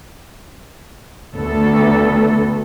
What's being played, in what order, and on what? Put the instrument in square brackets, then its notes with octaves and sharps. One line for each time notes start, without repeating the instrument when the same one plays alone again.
[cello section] D2 B3 A4